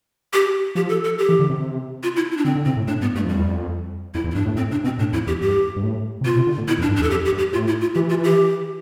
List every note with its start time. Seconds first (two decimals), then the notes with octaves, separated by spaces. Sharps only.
0.33 G4
0.75 F3 G4
0.89 A4
1.04 A4
1.19 G4
1.29 E3
1.39 D3
1.50 C3
2.03 F4
2.16 E4
2.31 E4
2.37 D4
2.45 D3 C4
2.55 D3
2.65 C3 C4
2.77 A2
2.88 A2 D4
3.01 G2 B3
3.15 G2 A3
3.25 F2 G3
3.36 E2
3.46 F2
4.14 F2 E4
4.24 E2
4.31 E4
4.35 G2 D4
4.45 A2
4.56 A2 C4
4.71 C3 D4
4.84 B2 C4
4.99 A2 D4
5.13 F2 E4
5.26 E2 G4
5.42 G2 G4
5.76 G2
5.83 A2
6.21 C3
6.25 B2 F4
6.37 C3
6.47 D3
6.58 A2
6.68 B2 E4
6.79 F2
6.82 D4
6.89 G2
6.96 D4
7.00 E2
7.03 A4
7.10 F2 G4
7.25 G4
7.32 G2
7.38 G4
7.53 A2 F4
7.67 E4
7.81 F4
7.95 E3 G4
8.09 F4
8.24 G4